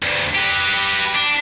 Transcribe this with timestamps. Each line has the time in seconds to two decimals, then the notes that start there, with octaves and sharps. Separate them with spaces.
0.02 D2 G2
0.35 G4 B4
1.15 D4